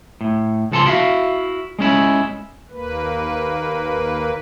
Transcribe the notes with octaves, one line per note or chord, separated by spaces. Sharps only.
A2
C#2 F3 A4 F#5 A5 C6
E4 F#4 E5 F5
G#3 C#4 E4
D#2 A#3 B4